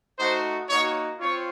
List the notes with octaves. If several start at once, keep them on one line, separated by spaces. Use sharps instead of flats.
A3 D#4 F#4 C5
A#3 D#4 F#4 C#5
C4 F4 C#5